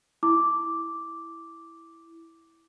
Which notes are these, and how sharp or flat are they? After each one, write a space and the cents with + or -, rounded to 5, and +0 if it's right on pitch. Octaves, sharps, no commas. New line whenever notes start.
E4 +0 D6 -5